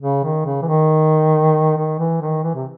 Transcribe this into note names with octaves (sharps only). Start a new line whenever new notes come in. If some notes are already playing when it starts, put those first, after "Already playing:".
C#3
D#3
C#3
E3
D#3
D#3
E3
D#3
E3
C3